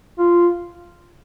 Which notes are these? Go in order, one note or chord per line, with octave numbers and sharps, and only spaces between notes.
F4